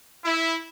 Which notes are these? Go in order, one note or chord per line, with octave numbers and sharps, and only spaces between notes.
E4